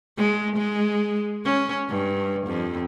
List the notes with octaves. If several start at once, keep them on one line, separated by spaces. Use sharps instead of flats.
G#3
G#3
C#4
G2
F2